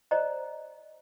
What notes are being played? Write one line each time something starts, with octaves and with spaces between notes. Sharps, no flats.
C5 D5 D#5 A#5